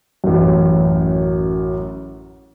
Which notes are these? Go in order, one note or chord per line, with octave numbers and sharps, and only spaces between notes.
A1 F#2